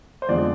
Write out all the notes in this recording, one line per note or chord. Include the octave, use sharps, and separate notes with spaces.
C5
F2 D3 F3 G#3 D5